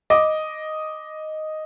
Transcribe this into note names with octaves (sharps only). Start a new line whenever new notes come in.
D#5 D6